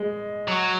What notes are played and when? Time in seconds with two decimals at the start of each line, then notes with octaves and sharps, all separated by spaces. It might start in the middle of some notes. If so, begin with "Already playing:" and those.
Already playing: G#3
0.48 F#3